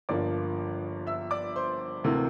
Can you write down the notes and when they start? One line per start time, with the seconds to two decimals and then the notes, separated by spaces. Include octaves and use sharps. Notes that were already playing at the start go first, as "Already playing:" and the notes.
0.09 G1 G2 F3 A#3 D5 D6
1.07 E5 E6
1.31 D5 D6
1.56 C5 C6
2.04 D2 C3 E3 A#3